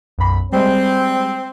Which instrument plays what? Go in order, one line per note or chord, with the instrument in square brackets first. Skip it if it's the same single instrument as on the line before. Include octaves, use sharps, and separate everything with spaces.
[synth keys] B1 F#2 B5
[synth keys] G3 G#3 [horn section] C4